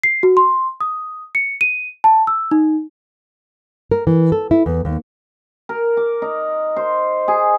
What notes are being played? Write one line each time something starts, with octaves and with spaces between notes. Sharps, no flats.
C7
F#4
C6
D#6
C#7
D#7
A5
E6
D#4
A#4
E3
A4
E4
E2
D#2
A#4
D6
D#4
C5
G#4